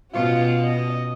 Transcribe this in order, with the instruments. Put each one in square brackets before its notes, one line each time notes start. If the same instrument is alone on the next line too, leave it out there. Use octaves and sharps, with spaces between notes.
[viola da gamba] B2 C#4 F#4 [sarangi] F4
[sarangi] D#5